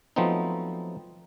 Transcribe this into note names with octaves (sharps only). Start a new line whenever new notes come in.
F3 F#3 A3 B3 C4 D#4